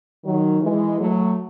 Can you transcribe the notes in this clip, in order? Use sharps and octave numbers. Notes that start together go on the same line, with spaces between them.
D#3 F#3
E3 G#3
F#3 A3